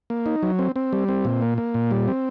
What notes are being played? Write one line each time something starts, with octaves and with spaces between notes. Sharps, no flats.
A#3
D#4
F#3
C4
C4
G3
C4
A#2
A#3
A#3
A#2
G3
C4